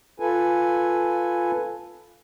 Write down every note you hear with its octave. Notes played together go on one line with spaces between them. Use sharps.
F4 A4 B4 G#5